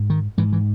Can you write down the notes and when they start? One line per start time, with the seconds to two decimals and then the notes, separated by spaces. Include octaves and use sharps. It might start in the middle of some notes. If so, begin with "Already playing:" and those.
Already playing: G#2
0.10 D#3
0.38 G#2 E3
0.53 E3